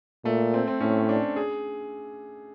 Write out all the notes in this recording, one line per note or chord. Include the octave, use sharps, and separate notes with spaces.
A#2 A3
C4
C4
A2 C#4
D4
G#4